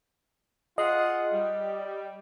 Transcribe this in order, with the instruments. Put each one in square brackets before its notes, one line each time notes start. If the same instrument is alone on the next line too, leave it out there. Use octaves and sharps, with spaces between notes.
[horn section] F4 G#4 F#5 [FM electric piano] D#5
[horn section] G3